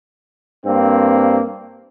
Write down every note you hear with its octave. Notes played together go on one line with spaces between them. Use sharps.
G2 A#3 C4